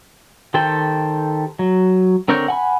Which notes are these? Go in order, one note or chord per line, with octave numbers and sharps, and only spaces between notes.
D#3 G4 A4 C5 G5
F#3
D3 C4 A#4 C#5 G6
F#5 G#5 B5